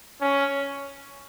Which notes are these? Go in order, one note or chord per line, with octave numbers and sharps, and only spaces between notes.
C#4